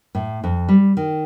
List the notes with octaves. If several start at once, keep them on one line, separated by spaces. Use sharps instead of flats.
A2
F2
G3
D#3